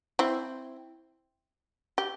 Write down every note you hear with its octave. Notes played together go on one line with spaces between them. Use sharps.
C4 E4
G4